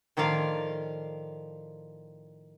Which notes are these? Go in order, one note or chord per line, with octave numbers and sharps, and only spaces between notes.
A2 D#3 F3 D5 F5